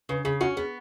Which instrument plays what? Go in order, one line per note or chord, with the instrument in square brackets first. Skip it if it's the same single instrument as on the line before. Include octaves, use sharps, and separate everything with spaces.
[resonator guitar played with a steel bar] C#3 [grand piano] B4
[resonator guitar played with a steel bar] C#3 [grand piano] G#4
[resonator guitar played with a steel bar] C#4 [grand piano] F#4
[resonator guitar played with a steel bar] B3 [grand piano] G#4